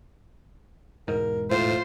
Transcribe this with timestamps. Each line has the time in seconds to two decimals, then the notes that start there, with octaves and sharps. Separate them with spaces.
1.08 E1 G#2 A#4
1.51 A2 F4 C5